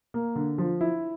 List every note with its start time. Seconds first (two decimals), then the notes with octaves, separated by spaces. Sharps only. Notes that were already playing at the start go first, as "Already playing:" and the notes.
0.14 A#3
0.36 D3
0.58 F3
0.81 E4